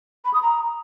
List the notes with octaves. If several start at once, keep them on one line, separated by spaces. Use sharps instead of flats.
B5
D#6
A#5